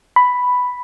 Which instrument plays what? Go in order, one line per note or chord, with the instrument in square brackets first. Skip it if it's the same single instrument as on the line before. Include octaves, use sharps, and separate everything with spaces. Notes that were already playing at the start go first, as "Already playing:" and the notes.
[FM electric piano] B5